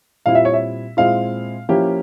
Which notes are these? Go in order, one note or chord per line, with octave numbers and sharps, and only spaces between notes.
A#2 G3 C4 E4 F5
E5
C#5
E5
A#2 G#3 C4 E4 F5
F3 A#3 C#4 E4 G4